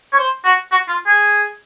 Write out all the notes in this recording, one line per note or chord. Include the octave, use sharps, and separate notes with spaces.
C#5
C5
F#4
F#4
F4
G#4